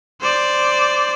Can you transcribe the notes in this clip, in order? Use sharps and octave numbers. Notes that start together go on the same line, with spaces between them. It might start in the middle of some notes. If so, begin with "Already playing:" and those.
C5 D5